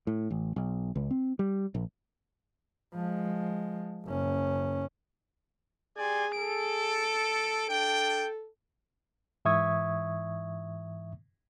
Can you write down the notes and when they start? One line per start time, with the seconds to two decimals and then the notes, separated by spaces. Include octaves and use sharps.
0.07 A2
0.30 A1
0.56 B1
0.96 C#2
1.11 C4
1.39 G3
1.75 A#1
2.94 F3 G#3
4.05 F#1 C#4
5.98 G4 G#4 D5 G#5 C6
6.39 A4 D7
7.69 D4 A4 G5
9.45 G#2 E3 E5 C#6 D#6 G#6